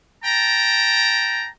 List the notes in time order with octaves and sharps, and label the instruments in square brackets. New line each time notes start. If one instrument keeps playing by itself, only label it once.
[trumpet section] G5 A5 A#5